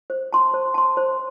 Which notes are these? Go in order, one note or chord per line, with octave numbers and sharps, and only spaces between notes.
C5
A5 C6
C5
A5 C6
C5